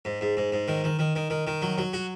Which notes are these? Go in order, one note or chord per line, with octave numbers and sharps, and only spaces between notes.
G#2
G#2
G#2
G#2
D#3
D#3
D#3
D#3
D#3
D#3
F#3
F#3
F#4